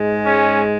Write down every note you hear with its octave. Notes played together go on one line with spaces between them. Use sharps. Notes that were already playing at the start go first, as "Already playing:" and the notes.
Already playing: G#2 G#3
C#4